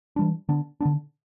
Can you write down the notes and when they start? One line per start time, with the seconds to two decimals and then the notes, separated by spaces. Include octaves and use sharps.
0.16 E3 G3 D4
0.49 D3 B3 D4
0.80 D3 B3 D4